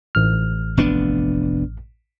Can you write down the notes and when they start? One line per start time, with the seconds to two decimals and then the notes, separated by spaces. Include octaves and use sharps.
0.15 A1 F6
0.77 F1 B3 D4